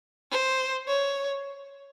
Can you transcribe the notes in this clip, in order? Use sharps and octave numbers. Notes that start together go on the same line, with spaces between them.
C5
C#5